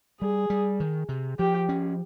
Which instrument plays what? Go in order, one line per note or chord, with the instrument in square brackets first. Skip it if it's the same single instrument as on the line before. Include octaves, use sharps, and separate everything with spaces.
[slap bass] G3 [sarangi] G#4
[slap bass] G3
D#3
C3
[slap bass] F3 [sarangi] G4
[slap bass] C#4